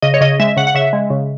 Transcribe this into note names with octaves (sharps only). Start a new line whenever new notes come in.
C#3 D#5
C#5
C#3 D#5
G#3 E5
C#3 F#5
F#5
C#3 E5
G#3
C#3